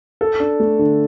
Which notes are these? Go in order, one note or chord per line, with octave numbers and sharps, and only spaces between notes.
A4
D4
A3
D3